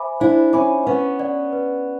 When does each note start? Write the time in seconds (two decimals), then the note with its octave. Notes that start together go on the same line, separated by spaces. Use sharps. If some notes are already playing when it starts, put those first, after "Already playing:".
Already playing: C5 E5 G#5 B5 D6
0.20 D4 E4 C5
0.53 C#4 D#4 E5 G#5 B5 D6
0.86 B3 C#4 B4
1.20 D5 F#5
1.53 B4